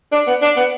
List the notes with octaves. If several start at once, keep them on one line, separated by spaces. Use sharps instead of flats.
D4
B3
D4
B3